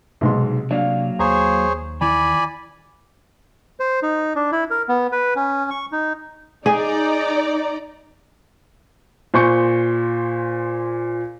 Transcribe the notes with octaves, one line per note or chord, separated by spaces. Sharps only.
B1 G#2 C3 C6
F#3 A#3 D4 F5
D#2 G#4 C5 C#5 A#5
D#3 E3 E4 D5 G#5 B5
C5
D#4
D4
E4
A#4
B3
B4
C#4
C#6
D#4
D#4 G#4 D5 A#5
A#2 C5 G#5 C#6 G6 C#7